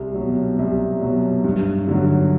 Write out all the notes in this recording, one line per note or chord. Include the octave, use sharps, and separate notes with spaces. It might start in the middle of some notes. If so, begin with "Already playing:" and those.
Already playing: C2
F#3
B2
C2
B2 F#3
G2
D3 F#3